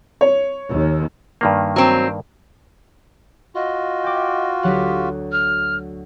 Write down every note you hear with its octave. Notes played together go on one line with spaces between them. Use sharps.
C#5
D#2
G2 D#3 A#3
F#3 C4
F4 F#4 D#5
G5 D6
D2 F#3 G4 F#5
F6